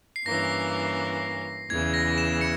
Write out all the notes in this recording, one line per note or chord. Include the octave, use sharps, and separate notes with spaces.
C7
G2 E3 A#3 C#4 A#6
E2 C#3 E3 G#6
A#6
E7
C#7